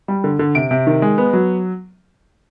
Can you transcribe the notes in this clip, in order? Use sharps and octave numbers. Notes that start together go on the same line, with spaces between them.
G3
D3
D3
C3 D7
C3
D#3
G#3
B3
F#3